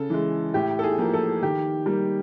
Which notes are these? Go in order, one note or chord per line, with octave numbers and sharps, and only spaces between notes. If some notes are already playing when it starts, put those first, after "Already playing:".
Already playing: C#3 A4
E3 G#3
A2 G4
A4
G#4
F3 A#3
A4
D#3 G4
G3 A#3